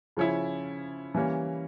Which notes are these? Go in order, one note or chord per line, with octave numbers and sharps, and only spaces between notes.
C#3 F3 C#4 E4
E3 G3 A#3 C#4